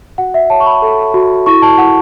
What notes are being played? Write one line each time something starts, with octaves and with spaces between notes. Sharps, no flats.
F#4 F#5
E5
C#5 A5
C#6
B5
A4
F#4
E4 C#6
A5
E4 F#5